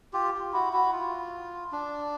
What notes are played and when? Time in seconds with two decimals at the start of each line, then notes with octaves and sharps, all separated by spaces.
0.13 F4 G4
0.34 F4
0.53 E4 F#4
0.73 E4 F#4
0.92 F4
1.72 D4